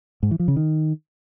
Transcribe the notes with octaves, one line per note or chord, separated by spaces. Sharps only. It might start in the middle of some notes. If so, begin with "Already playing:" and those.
G#2
E3
F3
C#3
D#3